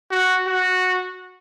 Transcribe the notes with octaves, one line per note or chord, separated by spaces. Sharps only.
F#4
F#4